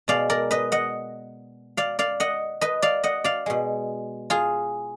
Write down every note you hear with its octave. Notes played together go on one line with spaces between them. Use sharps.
B2 G#3 D5 F5
A#4 D5
B4 D#5
D#5 F#5
D5 F5
D5 F5
D#5 F#5
B4 D#5
D5 F5
D#5 F#5
D5 F5
B2 G#3
F4 G#4